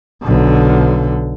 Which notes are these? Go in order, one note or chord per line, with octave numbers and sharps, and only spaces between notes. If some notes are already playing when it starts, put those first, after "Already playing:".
B1 D3